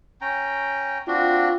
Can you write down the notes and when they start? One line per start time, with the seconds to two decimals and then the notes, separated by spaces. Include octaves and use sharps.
0.21 C#4 G5 A#5
1.08 C4 D4 F4 F#4